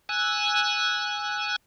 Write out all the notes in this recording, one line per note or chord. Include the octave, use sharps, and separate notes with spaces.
G#5 E6 F#6